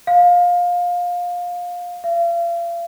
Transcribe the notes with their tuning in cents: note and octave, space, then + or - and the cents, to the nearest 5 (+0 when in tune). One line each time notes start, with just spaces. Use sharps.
F5 +20
F5 -40